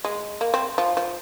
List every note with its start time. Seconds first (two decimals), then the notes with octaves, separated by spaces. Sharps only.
0.05 G#3
0.41 A#3
0.54 C4
0.78 F3
0.97 F3